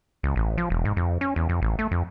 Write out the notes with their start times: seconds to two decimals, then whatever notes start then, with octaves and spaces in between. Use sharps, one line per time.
0.23 C#2
0.36 A1
0.58 F3
0.70 E1
0.85 G#2
0.97 F2
1.21 C#4
1.36 E2
1.49 F2
1.62 A1
1.79 A3
1.91 F2